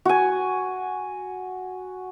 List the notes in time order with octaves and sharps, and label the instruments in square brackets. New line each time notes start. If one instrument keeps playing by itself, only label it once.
[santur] F#4 G#5